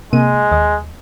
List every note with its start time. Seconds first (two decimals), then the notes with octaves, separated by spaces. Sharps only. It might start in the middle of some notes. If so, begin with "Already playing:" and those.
0.13 C3 G#3 A#3 D#7
0.52 D#2 D#5